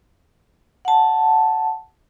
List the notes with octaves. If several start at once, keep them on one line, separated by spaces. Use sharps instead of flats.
F#5 A5